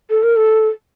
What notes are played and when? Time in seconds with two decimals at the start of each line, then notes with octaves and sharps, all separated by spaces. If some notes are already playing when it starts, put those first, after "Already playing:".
0.10 A4
0.23 A#4
0.36 A4